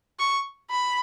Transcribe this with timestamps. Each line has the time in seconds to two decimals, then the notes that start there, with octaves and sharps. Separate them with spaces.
0.20 C#6
0.71 B5